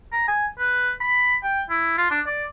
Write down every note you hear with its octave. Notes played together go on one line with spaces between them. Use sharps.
A#5
G#5
B4
B5
G5
E4
F4
D4
D5